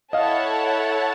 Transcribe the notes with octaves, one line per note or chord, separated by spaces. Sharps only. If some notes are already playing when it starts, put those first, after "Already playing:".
E4 A4 C#5 D#5 F5 F#5 A5